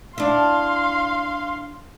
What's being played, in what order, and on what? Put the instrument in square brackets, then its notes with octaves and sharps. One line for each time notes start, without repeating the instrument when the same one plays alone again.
[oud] D4 E4 [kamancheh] F5 C6